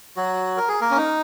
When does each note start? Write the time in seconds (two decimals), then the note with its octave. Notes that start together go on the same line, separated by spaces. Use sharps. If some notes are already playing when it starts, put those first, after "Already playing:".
0.17 F#3 F#4
0.57 A#4
0.68 G#4
0.81 A#3 A#4
0.91 C#4
0.97 D#4